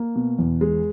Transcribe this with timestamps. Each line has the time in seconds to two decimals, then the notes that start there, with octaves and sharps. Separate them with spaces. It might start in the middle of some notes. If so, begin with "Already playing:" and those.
Already playing: A#3
0.16 B2
0.38 E2
0.61 G#3